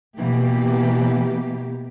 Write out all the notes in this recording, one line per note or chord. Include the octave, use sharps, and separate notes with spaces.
B2 E3 A#3 G4